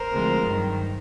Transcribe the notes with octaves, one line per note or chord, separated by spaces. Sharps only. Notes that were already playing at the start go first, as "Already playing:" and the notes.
Already playing: A#4 C5
D2 C3 F3 G#3
G2 D#3 F#3